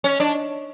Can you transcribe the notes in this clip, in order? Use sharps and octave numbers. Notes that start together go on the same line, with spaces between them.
C#4
D4